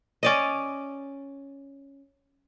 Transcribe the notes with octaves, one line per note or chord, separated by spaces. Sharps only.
C#4 D5 D#5